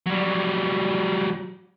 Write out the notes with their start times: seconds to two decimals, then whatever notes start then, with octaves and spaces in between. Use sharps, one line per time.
0.07 F#3 G3